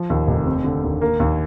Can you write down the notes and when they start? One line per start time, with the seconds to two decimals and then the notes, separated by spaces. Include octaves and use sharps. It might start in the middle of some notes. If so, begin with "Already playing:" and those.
Already playing: F3
0.10 D#2
0.27 F1
0.46 C4
0.64 D3
0.83 D#2
1.02 A#3
1.20 D#2